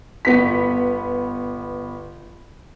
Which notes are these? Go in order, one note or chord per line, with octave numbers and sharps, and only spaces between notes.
G1 B3 B6